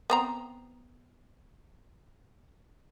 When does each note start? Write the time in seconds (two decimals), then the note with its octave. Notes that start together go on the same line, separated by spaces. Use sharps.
0.10 B3 C4 A#5